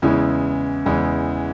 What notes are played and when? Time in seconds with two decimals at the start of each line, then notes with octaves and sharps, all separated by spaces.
0.02 E2 C#3 E3 G#3
0.86 E2 C#3 E3 G#3